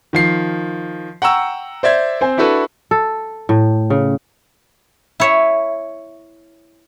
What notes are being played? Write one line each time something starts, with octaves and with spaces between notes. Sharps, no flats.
D#3 F3 C7
F#5 G5 A#5 C#6 E6
C5 D5 E5 G#6
C4 C5 G#5
D4 E4 F#4 A4 B4
A4
A2
C#3
E4 C#5 E5